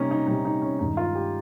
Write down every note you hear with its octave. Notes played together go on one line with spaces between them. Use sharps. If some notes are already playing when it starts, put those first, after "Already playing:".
Already playing: C3 G3 A#3 C#4 D#4
D#4
C3 G3 A#3 D#4
D#4
C#4
G2 D#3 G#3 D#4
F4
G4